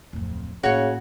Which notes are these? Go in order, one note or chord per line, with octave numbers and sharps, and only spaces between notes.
D1 F2
A2 C#3 A#3 F#4 C#5 G#5